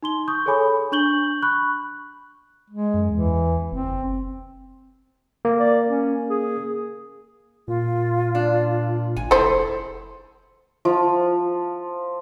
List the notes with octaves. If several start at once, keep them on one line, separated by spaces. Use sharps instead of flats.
D#4 C6 G7
C#6 D#6 G6
G#4 A4 C#5 G#5 B5 D6
D4 C#6 G6 F#7 G7
B5 C#6 F#6
G#3
F#2
E2 E3
F#1 C4
A#3
D5
C#4
G#4
A#2 F4
D4
G#1 G#5
F1 E4 G#4 A4 C5
F3